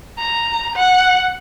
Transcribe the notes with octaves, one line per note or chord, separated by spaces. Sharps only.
A#5
F#5